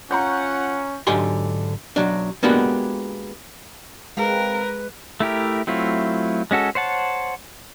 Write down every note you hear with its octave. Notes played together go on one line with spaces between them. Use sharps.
C#4 F4 F#5 A#5 C#6 G6
G#2 D3 F#3 G4 G#5 C6
B1 F#3 D4
G#3 A#3 B3 D4 F#4 G4
G#3 C4 G#4 A#4 B4 F5
A3 E4 G4 A#4
F#3 A3 C4 E4 F4
G#3 C#4 F#4 A4
C5 C#5 F#5 A5